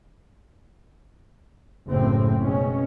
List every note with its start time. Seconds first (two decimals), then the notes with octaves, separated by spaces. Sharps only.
1.89 F#1 A2 C4
2.42 B2 G#3 C#4